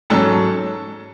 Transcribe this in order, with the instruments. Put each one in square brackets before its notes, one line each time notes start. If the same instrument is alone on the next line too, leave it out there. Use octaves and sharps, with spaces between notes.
[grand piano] G#2 F#3 C#4 A4 A5